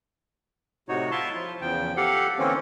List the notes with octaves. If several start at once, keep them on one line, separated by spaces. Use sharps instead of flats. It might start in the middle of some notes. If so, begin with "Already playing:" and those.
A2 C3 D#4 F#4 C#5
E4 F4 E5 A5 C6
F3 F4
E2 C#3 F3 G5
G4 A4 F5 F#5
D3 E3 A#3 C4 C#4